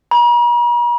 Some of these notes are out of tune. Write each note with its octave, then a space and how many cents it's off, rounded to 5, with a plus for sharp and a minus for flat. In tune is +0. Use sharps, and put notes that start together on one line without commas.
A#5 +45